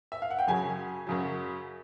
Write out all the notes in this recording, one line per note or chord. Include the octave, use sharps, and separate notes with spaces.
E5
F5
F#5
G5
F#2 C#3 F#3 G#4 G#5
F#2 C#3 F#3